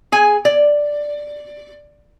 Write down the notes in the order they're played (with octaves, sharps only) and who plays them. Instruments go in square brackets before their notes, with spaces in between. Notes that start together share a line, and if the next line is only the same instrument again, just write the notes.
[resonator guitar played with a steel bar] G#4 G#5
D5